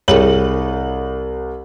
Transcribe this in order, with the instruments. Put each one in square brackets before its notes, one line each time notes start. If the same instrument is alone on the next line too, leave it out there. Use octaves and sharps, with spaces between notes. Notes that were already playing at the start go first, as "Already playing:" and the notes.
[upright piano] C2 F#7 [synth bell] G#4 A#4 C#5